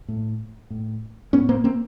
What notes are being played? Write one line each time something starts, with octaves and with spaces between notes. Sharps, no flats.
A2
A2
A2 B3 C#4
A#3 C4
A#3 C4